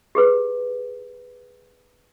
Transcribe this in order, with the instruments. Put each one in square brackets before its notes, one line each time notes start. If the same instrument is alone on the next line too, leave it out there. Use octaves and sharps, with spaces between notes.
[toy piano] G4 G#4 B4